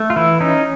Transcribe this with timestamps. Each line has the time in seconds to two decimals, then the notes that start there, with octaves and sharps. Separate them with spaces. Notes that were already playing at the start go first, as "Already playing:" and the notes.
Already playing: A3
0.10 F4
0.16 E3 E4
0.41 C#4 D#4